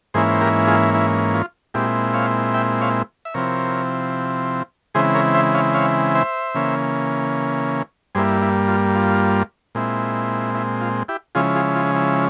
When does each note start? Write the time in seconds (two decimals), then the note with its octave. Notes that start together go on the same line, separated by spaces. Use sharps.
0.14 G#2 E3 A#3 C#4 E4 G#4 C5
0.31 C5
0.41 G4 A#4
0.67 F4 G#4
0.94 E4
1.34 F4
1.74 A#2 G#3 C4 E4 G4
2.14 C#5 F5
2.54 E5 G5
2.81 C#5 F5
3.25 E5
3.34 C3 F3 C4 E4 A#4 C#5
4.95 C#3 E3 G#3 C4 E4 G#4 C5
5.14 A#4 C#5
5.34 C5 E5
5.55 C#5 F5
5.74 C#5 F5
6.15 C5 E5
6.55 C#3 E3 A#3 C#4
8.15 G2 G3 A#3 E4 G#4 C5
8.42 E4
8.68 F4
8.95 F4
9.75 A#2 G#3 C4 E4
10.55 E4
10.81 F4
11.08 E4 G4
11.35 C#3 F3 G#3 C#4 E4 F4 G#4
11.55 F4 G#4
11.75 F4
11.95 E4